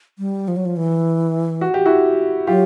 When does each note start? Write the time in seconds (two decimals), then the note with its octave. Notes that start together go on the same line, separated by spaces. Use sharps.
0.19 G3
0.48 F3
0.56 F#3
0.65 F3
0.77 E3
1.61 F#4
1.74 G4
1.85 E4 F#4
2.47 F#3 F4 G4